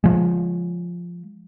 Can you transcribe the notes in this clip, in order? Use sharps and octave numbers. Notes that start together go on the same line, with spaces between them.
F3 G#3